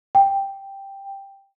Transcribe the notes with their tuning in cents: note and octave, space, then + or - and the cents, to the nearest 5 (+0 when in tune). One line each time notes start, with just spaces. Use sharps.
G5 +5